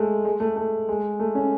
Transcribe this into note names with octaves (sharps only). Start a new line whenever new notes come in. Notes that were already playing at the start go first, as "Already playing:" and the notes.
Already playing: G#3 A3
G#3
A3
A3
G#3
A3
C#4